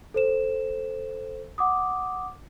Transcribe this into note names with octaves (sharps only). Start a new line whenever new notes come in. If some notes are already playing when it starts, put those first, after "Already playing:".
A4 C5 E7
F#5 D6 D#6